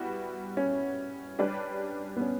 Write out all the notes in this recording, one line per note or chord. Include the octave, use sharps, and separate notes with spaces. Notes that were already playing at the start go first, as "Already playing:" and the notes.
Already playing: G3 B3 E4 F#4
C#4
G3 D4 G4 B4 D5
B3
C#4